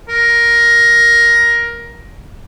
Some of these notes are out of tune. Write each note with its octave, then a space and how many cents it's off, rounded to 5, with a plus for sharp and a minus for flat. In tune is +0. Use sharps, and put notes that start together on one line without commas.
A#4 +10